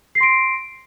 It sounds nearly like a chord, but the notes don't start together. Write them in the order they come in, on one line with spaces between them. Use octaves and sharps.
C7 A#6 C6 D7